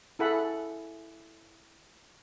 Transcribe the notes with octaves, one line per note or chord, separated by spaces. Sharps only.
E4 G#4 A4 F#5 B5